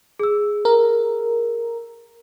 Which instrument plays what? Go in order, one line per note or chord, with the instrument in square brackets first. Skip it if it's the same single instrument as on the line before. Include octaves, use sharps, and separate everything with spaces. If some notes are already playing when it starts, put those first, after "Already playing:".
[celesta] G#4 E6
[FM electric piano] A#4